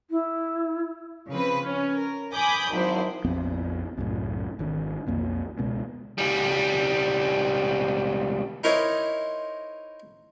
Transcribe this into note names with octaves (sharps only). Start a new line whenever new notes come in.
E4
C#3 F3 C4 B4
C#4
A#4
G#5 B5 D6 D#6 G6
G#1 F#3 E4 C5
A#1 F2 B3 C4
C2 F#2 A2
G#1 D#3 D4
B1 F2 A#3
C#2 B2 G#3
C#2 G3
D#4 E4 A#4 C5 C#5 D#5